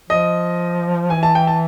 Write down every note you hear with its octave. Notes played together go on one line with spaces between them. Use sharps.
F3 D#5
E3 G#5
A5
G5
A5